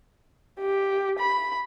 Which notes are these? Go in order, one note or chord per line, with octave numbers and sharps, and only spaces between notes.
G4
B5